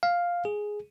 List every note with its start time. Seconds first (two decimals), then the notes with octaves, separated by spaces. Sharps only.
0.03 F5
0.45 G#4